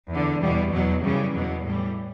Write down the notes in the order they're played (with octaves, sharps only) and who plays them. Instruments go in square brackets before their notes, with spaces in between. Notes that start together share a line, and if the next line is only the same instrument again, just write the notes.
[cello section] E2 D3
E2 B2 G3
E2 B2 F#3
F#2 C#3 E3 G3
E2 B2 F#3
A2 E3 G3